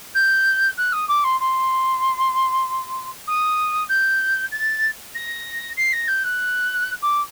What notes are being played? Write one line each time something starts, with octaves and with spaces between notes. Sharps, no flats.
G6
F#6
D#6
D6
C6
C6
D#6
G6
A6
A#6
C7
A#6
G6
F#6
D6